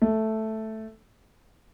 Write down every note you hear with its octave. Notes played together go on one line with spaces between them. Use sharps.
A3